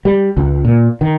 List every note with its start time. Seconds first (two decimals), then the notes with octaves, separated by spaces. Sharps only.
0.05 G3
0.37 C#2
0.65 A#2
1.01 D#3